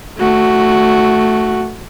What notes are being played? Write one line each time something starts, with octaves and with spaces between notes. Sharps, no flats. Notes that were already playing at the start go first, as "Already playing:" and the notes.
A3 F#4